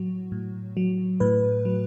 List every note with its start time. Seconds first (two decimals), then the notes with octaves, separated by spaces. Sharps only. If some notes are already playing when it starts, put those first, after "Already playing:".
Already playing: A2 F#3 F#4
0.32 A2
0.77 F#3
1.20 A2 B4
1.65 F#3